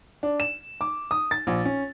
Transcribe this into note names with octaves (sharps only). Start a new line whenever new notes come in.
D4
E7
D6
D#6
A6
A#1
C#4